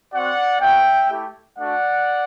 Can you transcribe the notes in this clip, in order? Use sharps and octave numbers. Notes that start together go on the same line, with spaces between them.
C4 F#4 D5 F#5
B3 F#4 E5 G5
A3 E4 G4
A3 D4 F#4 D5 F#5